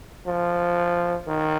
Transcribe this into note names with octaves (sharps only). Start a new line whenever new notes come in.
F3
D#3